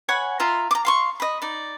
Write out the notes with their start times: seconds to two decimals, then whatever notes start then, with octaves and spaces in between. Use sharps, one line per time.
0.09 C#5 F#5 G#5 B5
0.40 F4 E5 A#5 C6
0.71 A#5 D6
0.85 F5 C6 C#6
1.20 D#5 B5
1.42 D#4 D5